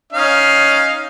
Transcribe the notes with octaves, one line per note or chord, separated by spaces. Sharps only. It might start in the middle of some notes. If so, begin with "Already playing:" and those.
C#4 D#4 F5